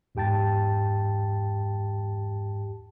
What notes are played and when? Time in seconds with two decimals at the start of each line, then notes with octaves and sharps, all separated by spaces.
0.15 E2 G#2 G4 G5 A5 A6